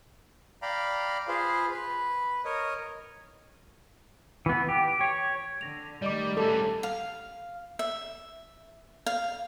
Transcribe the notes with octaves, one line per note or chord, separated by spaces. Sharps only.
D5 F5 G5 A#5 B5
F4 G#4 B4 C5 F5
B4
A#4 C#5 D#5
E3 B3
G4
C#5
D3 A#6 F7
D#3 G3 A3 D5 D#5 D6
G3 C#4 A4
F5
E5
F5